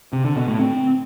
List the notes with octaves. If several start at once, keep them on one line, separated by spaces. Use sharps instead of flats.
C3
D3
B2
A2
C4